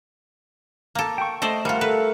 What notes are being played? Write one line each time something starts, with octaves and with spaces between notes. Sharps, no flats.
A#3 A4
G5 C#6
A3 A4 C5 D5 D#5
G3 F4 A#4 F5 F#5
A4 B4